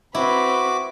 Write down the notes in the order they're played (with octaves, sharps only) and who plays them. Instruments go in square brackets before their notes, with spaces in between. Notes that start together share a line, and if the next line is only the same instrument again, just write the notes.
[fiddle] C4 B4 [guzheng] E4 [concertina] F#4 D6